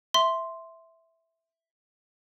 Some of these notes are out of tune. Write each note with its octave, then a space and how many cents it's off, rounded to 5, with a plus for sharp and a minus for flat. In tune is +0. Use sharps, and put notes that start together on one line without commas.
E5 +0 C6 +0